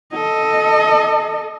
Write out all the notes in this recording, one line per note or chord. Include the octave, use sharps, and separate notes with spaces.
A4 D#5